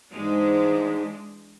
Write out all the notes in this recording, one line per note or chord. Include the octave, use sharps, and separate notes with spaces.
G#2 E3 G#3 D4